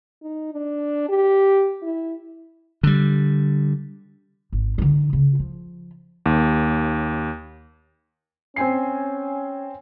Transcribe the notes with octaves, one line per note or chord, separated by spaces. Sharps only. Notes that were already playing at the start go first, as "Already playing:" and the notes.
D#4
D4
G4
E4
D3 G3
G#1
D3 D#4
C#3
F3
D#2
C4 C#4 G#5 C7